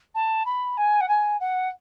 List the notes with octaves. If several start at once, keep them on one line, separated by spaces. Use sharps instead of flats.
A5
B5
G#5
F#5
G#5
F#5